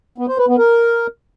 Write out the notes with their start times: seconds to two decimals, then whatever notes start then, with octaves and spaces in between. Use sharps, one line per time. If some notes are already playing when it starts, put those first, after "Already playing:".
0.18 B3
0.28 C5
0.38 B4
0.48 B3
0.58 A#4